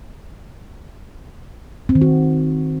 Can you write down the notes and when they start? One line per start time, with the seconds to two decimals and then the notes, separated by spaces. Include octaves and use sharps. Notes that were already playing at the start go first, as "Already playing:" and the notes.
1.89 C4
1.95 D#3
2.02 F#4